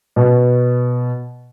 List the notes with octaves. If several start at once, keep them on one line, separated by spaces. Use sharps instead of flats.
B2